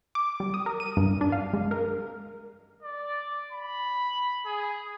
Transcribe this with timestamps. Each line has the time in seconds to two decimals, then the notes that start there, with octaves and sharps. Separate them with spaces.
0.15 D6
0.40 G3
0.54 D#6
0.66 A#4
0.80 D#7
0.97 G2
1.21 D4
1.32 F5
1.54 G#3
1.71 A#4
2.82 D5
3.51 B5
4.45 G#4